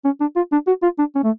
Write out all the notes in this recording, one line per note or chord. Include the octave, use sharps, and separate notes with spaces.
C#4
D4
F4
D4
F#4
F4
D4
C#4
A3